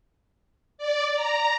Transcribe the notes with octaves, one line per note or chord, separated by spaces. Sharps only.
D5
A#5